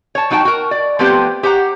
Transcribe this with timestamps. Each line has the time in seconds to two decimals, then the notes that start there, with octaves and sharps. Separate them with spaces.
0.15 C#5 A5
0.30 F#3 D#4 F#4 G5 A5
0.45 F#4 A#4
0.71 D5
0.99 F3 A3 B3 C4 G4 C5
1.43 G4 C5 F#5 A#5